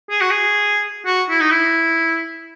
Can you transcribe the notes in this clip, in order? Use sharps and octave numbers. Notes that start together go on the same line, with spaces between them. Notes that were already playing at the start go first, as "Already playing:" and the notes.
G#4
F#4
G#4
F#4
E4
D#4
E4